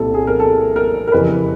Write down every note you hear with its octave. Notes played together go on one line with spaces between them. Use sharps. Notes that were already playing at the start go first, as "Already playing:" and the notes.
Already playing: C2 A#2 G3 C4 E4 A4
G#4
A#4
A4
A#4
A#4
F2 C#3 E3 G3 B4